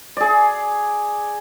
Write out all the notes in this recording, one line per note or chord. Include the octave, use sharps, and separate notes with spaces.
G#4 D5